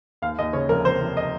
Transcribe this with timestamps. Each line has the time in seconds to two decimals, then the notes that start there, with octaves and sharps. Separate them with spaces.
0.22 D#2 F5
0.38 D#2 D#5
0.53 C#3 C#5
0.69 F1 A#4
0.85 F1 C5
1.01 F1
1.17 D#5